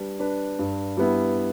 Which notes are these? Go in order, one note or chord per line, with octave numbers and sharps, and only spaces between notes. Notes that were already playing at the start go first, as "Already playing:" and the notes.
Already playing: G3 D4 B4
D4 B4
G2
G3 B3 E4